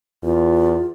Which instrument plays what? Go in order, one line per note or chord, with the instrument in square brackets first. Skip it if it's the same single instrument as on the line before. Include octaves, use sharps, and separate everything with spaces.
[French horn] E2 [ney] F4